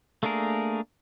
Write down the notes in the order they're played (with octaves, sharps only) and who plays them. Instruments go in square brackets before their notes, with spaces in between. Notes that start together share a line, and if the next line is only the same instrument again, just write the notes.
[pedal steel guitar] A3 A#3 D4 G#4 A#4